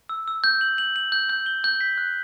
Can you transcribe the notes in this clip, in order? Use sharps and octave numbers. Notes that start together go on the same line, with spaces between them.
E6
E6
G6
F#7
F#7
F#7
G6
G6
G7
G6
B6
F#6